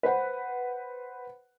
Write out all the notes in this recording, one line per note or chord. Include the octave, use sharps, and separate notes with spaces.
B4 C5 F#5 B5